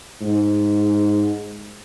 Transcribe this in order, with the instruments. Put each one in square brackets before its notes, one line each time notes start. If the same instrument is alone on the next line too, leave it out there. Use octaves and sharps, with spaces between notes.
[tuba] G#2